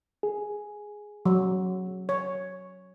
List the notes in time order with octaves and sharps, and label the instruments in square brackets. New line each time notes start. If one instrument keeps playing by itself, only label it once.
[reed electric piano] G#4
[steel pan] F#3
C#5